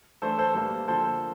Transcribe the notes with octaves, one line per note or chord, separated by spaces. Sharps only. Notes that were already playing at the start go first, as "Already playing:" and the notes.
E3 A3 D4 A4 C5
A4 C5
A2 G3 A#3 D4
D3 F3 A#3 D4 A4 C5